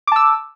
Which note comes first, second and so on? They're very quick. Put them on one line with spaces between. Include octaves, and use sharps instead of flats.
D6 A5 E6